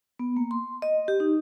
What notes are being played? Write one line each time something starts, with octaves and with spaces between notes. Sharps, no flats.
B3
A#3
C6
D#5
G4
D#4